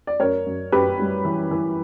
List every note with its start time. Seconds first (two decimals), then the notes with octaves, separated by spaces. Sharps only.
0.07 D5
0.20 F#2 A#4 C#5
0.47 F#2
0.72 F#2 G4 B4
1.00 G3
1.25 E3
1.51 E3